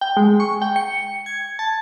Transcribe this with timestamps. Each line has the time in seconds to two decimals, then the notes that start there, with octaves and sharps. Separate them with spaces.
0.01 G5
0.17 G#3
0.40 C#6
0.62 G5
0.76 C#7
1.26 G#6
1.59 A5